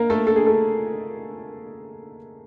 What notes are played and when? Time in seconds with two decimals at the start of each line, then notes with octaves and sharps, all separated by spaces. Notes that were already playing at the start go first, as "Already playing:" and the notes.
Already playing: A#3 A#4
0.10 A3 A4
0.27 A4
0.36 G#4
0.46 A3 A4